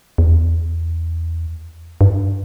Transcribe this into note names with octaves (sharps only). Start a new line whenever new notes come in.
E2
G2